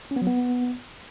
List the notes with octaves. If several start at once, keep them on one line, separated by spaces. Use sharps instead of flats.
C#4
B3
F#3
B3